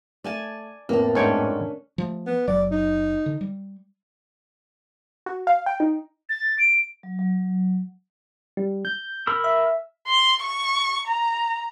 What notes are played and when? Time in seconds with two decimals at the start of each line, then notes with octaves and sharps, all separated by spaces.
0.24 A3 D5 G#5 A5
0.89 F2 A2 A#3 B3 A5
1.15 G#2 A3 C#4 D4 C#5 G5
1.98 F3 A3
2.26 B3
2.47 F#1 F#3 D5
2.71 D#4
3.26 D3
3.41 G3
5.26 F#4
5.47 F5
5.66 G5
5.80 D#4
6.29 A6
6.59 D7
7.03 F#3
7.19 F#3
8.57 G3
8.85 G6
9.27 A#4 B5 E6
9.44 E5
10.08 C6
10.42 C#6
11.07 A#5